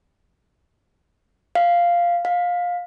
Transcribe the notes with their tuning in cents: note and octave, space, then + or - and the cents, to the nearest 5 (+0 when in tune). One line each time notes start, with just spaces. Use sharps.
F5 -5
F5 +20